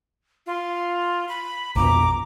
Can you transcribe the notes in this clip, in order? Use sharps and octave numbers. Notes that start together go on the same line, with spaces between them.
F4
B5
A#1 F2 B2 A#5 D6